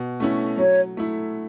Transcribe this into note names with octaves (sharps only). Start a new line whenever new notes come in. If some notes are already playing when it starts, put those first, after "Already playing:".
Already playing: B2
A3 C#4 E4
F#3 C#5
A3 E4